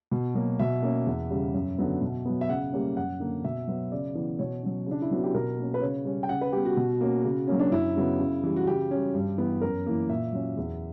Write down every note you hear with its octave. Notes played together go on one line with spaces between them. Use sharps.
B2
F#3 A#3
B2 E5
A#3 C#4
E2
C#3 G3
F#2
D3 F#3 B3
B2
F#3 B3
E5
C#3 F#5
G3 A#3 C#4
F#2 F#5
D3 A#3
B2 E5
F#3 B3
C#3 D5
E3 B3
B2 C#5
F#3 C#4
C#3 D4
E4
F#3 B3 F#4
G4
B2 A#4
A#3 C#4
B4
C#3 C#5
G3 C#4
G5
C#3 F#5
B4
G3 B3 G4
F#4
B2
A#3 C#4
C#3
F#3 A#3 C#4
D4
F#2 E4
C#3 F#3 B3
C#3
E3 G3
F#4
C#3 G4
G3 C#4
G2
E3 B3
F#2 A#4
E3 A#3
A#2 E5
F#3 C#4
E2